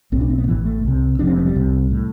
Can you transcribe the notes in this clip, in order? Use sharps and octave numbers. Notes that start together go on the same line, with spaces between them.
B1 A2 C4
D4
C4
B3
A1 A2 E3
A3
C2 C3
F1 F2 C3 D4
C4
B3
G3
C2 C3
A2